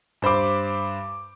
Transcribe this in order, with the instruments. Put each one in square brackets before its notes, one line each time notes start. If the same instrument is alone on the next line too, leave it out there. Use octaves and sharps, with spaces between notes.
[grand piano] G2 C5 B5 D6